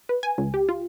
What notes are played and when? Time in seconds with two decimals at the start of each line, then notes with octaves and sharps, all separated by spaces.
0.09 B4
0.23 G#5
0.38 C#2
0.54 G4
0.69 F4